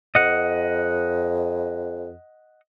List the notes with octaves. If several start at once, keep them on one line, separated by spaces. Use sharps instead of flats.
F2 D#5 F#5